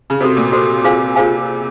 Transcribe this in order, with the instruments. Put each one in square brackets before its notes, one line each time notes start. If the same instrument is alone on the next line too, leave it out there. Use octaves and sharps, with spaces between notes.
[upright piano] C#3
[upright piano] C3 [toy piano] F#4 A4 C5
[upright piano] A#2
[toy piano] F#4 A4 C5
F4 G#4 C5 F5 G#5
F4 G#4 C5 F5 G#5